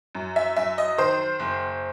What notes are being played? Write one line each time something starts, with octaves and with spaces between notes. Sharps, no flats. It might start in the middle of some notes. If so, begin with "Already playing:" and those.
F#2
E5
F#2 E5
D#5
D#3 C5
F#1